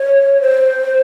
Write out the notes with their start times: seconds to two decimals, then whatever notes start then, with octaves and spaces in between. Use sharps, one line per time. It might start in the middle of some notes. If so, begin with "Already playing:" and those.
Already playing: C#5
0.41 C5